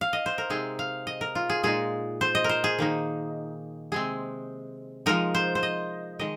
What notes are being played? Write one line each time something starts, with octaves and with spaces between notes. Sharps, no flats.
F5
D#5
C5
A#4
C3 G#3 C4 D#4 G#4
F5
D#5
A#4
F4
G#4
A#2 G#3 D#4 G#4
C5
D#5
A#4
C5
G#4
D#3 A#3 D#4
C3 G#3 C4 G#4
F3 G#3 D#4 A#4
C5
C5
D#5
D#3 G#3 D#5